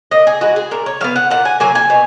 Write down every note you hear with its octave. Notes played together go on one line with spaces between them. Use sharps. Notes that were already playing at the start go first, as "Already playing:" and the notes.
A#2 D#5
G#4
G#3 B3 F#4
G#4
A#2 A#4
C#5
F#3 B3 F5
F#5
A#2 F#5
G#5
F#3 A#3 G#5
G#5
B2